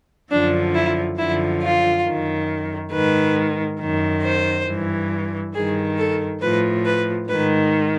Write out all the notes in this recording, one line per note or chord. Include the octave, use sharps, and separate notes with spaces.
F#2 D3 F3 D4
E4
F#2 D3 F3 E4
F4
F#2 D#3
G#2 D#3 B4
F#2 D#3
C5
G2 E3
G2 D#3 G#4
A4
A2 F3 B4
B4
G#2 D#3 B4